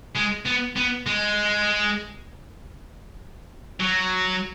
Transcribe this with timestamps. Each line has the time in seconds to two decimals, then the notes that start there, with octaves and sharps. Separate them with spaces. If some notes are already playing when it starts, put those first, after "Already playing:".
0.16 G#3
0.46 B3
0.77 B3
1.07 G#3
3.80 F#3